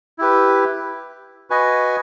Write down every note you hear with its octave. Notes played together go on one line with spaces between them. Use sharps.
E4 G4 B4
F#4 B4 D#5 G#5